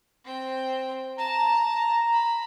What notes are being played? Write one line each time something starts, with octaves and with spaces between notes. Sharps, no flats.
C4 G5
A5 A#5
B5